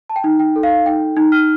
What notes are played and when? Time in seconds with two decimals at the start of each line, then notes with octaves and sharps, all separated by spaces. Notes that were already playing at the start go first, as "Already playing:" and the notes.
0.10 A5
0.16 G5
0.24 D#4
0.39 G5
0.56 A4
0.63 F5
0.86 D#4 G5
1.16 D#4
1.32 F6